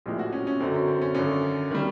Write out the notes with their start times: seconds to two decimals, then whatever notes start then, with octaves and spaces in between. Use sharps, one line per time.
0.06 A#1 A2 F3 G#3 G4
0.19 F#4
0.33 C#4
0.47 C#4
0.60 F#2 D3 F#3 C4
0.74 C#4
0.87 C4
1.02 C#4
1.15 G#1 F#2 D3 C#4
1.71 D#3 G3